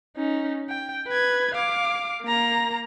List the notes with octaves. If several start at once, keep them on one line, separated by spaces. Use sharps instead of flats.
C#4 D#4
G5
B4 G#6
F5 D6
A#3 A#5